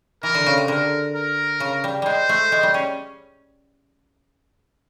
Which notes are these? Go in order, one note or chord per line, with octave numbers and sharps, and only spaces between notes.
E3 A#4
D3
C#3
C3
D3 A#4
A#4
C#3
G3
G3 G#3 C5
A3
G#3
G3
C#4